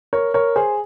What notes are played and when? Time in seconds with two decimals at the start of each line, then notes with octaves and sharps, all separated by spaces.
0.13 A#4 C#5
0.34 A#4 C#5
0.56 G#4 C5